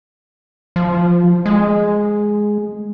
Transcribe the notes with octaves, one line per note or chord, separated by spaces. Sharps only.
F3
G#3